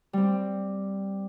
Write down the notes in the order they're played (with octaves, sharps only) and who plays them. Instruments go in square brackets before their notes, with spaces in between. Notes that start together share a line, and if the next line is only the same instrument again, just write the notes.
[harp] G3 C4